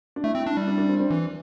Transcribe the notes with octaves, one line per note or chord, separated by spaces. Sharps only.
D4
A3 E4
C4
D4
G3
D4
D4
C4
C4
E3